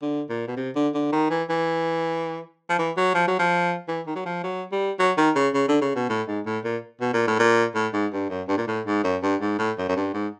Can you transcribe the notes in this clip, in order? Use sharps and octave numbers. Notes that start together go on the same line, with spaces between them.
D3
A#2
B2
C3
D3
D3
D#3
E3
E3
F3
E3
F#3
F3
F#3
F3
E3
D#3
F#3
F3
F#3
G3
F#3
D#3
C#3
C#3
D3
C#3
B2
A2
G#2
A2
A#2
B2
A#2
A2
A#2
A2
G#2
G2
F#2
G2
A#2
A2
G#2
F#2
G2
G#2
A2
F#2
F#2
G2
G#2